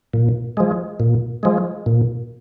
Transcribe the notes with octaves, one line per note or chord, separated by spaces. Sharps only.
A#2
F3 G#3
A#2
F3 G#3
A#2